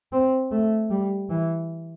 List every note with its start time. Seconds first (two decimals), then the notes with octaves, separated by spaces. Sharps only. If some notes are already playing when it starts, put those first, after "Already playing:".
0.12 C4
0.51 A3
0.90 G3
1.30 E3